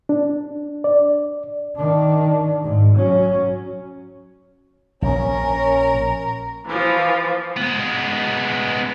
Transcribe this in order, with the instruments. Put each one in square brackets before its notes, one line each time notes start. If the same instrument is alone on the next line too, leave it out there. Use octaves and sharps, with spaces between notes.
[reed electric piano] D4
D5
[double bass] D#3 D4
G#2
F#3 C#4
[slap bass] A#1 [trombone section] C#4 [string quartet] A#4
[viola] E3 F3
[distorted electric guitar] G#3 B3